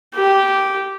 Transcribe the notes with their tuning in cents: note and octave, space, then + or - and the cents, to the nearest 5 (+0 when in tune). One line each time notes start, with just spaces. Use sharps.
G4 -10